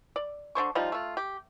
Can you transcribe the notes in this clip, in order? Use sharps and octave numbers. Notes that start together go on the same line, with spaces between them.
D5
D3 D4 C5 C#6
F3 G3 D#4 F4
A3 F4
G4